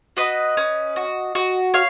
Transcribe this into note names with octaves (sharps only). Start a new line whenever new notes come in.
F#4 B4 D#5
C#4
F#4
F#4
C#5 F5